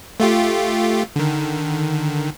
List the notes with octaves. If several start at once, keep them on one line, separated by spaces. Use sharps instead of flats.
A3 F4 G4
D3 D#3